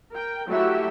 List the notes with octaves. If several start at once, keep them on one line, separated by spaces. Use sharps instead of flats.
A#4 G5
F#3 A3 E4 F#4 G4 E5